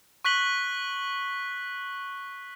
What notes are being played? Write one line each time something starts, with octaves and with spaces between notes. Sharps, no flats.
C#6 F#6 B6 F#7 G7